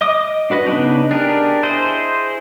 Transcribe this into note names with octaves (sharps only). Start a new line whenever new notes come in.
D#5 D6 D#6
D4 F#4 B4 D#5
C#3 B3 C4 D4 D#4
D4 G4 G#4 A#4
E4 G#4 C5 D#5